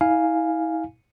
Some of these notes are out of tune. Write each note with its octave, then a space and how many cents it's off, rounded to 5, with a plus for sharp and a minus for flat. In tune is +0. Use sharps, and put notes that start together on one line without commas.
E4 -35 F5 +0 G#5 +0